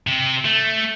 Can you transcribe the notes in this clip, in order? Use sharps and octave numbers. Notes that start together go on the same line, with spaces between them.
C3
A3